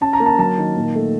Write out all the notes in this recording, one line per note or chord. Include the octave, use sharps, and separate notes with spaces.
C#4 A5
A#5
A#3
A5
F#3 A5
D#3
A#2
A3